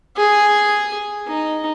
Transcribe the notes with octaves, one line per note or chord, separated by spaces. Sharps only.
G#4
D#4